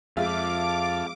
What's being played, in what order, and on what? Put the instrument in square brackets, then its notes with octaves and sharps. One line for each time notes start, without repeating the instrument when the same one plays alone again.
[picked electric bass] F2 [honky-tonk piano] G#3 F4 E5 [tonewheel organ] F5 A5 [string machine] D6